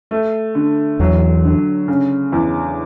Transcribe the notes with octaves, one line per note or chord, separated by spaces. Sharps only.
A3
D3
E2 E3 F#3
D3
C#3
E2